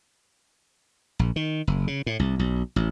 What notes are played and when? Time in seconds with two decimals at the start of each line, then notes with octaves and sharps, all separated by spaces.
1.19 A#1
1.36 D#3
1.67 F#1
1.87 C#3
2.06 A2
2.19 C2
2.39 B1
2.76 A1